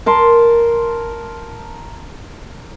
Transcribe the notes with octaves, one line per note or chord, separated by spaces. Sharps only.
A#4 A5 C6